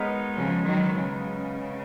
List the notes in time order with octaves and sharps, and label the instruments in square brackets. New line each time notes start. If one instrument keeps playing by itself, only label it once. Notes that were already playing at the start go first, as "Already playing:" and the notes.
Already playing: [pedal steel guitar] G#3 B3 D#4 A#4 C#5
[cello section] C#3 F3
D#3 F#3
C#3